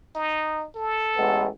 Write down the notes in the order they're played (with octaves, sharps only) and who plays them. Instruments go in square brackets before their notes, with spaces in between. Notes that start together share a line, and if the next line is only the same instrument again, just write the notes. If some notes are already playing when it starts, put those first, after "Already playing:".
[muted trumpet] D#4
A4
[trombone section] A1 G#3 B3